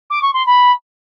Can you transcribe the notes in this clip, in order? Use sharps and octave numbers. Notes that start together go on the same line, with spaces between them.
D6
C#6
C6
B5